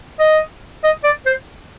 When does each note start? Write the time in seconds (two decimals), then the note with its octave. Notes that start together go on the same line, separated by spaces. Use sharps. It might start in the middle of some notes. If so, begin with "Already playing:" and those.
0.20 D#5
0.84 D#5
1.04 D5
1.26 C5